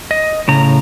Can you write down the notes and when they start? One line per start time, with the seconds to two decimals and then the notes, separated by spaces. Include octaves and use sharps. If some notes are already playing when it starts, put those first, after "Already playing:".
0.11 D#5
0.48 A2 C#3 A#5